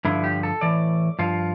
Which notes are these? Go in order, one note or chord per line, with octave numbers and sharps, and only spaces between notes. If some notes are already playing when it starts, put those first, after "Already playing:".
G2 D3 F3 E4
G4
A4
A2 E3 D5
G2 F3 F4